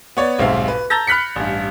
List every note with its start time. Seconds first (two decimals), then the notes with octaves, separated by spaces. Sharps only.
0.17 B3 C#5 D5
0.38 D#1 B1 G#2 C4 E5 F5
0.68 B4
0.90 A5 A#5 E6 G6 A6 A#6
1.07 B5 F6 F#6 B6 C#7
1.36 A1 G2